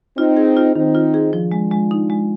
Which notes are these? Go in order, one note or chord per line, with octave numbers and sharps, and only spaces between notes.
C4 D#4 F4
G#4
F4
D#3 C4 D#4
F4
G#4
F3 D4 F4
G#3
G#3
D#4
G#3